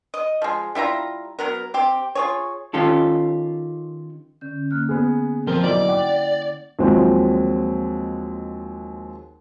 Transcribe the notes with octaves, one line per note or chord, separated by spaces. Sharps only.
D#5
F3 G#3
G3 E4 F4 A#5
F#3 B3 A#4
C4 G4
F4 G#4 C#5
D#3 C#4 F4 G4 A4
D3 C#4 G6
A#3 F6 F#6
B3 G#4
F3 C4 A#4 G7
B1 E4 D5 F#7
F#5 G5 D6
D#2 F3 F#3 G#3 C4